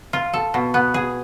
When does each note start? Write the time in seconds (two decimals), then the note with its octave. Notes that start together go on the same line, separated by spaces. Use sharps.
0.13 F4
0.33 A4
0.54 B2
0.74 B3
0.94 G#4